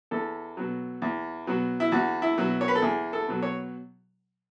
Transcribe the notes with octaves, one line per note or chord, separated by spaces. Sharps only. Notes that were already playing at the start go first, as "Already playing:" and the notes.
E2 A4
B2 F#3
E2
B2 F#3
E4
E2 F#4
E4
B2 F#3
C#5
B4
A4
E2 G#4
A4
B2 F#3
C#5